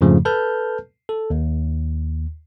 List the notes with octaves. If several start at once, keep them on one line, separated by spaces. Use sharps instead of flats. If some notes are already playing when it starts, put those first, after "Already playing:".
F2 G#2 C#3 F3 A3
A4 B4 A5 F6 G6
A4
D#2